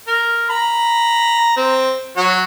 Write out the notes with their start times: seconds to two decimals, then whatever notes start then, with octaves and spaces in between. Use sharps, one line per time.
0.07 A#4
0.50 A#5 B5
1.57 C4
2.17 F#3 F#4 C#5